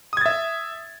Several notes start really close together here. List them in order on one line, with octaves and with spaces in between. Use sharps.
D#6 G#6 A6 E5